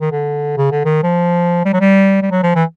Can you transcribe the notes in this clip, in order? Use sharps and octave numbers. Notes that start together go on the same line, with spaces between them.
D#3
D3
C#3
D3
D#3
F3
G3
F#3
G3
G3
F#3
F3
E3